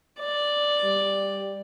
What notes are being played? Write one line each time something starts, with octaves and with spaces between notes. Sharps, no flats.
D5
G3